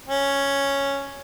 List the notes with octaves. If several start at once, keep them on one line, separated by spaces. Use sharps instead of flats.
C#4